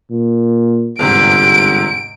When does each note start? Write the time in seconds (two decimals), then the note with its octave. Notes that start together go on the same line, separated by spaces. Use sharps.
0.11 A#2
0.99 G1 E2 G#2 C3 D7